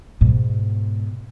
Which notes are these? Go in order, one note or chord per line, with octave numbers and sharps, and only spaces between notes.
G#2 B2